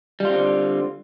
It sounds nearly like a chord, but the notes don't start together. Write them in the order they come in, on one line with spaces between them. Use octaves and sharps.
G3 F4 C4 D3